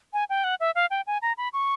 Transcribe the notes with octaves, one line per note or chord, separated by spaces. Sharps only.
G#5
G5
F#5
E5
F5
G5
G#5
A#5
B5
C#6